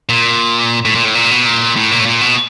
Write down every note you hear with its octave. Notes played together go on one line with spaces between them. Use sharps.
A#2
A2
A#2
A2
A#2
B2
A#2
A2
A#2
A2
A#2
B2